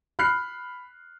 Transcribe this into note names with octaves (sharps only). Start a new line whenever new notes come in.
B5 F6 F#6 C7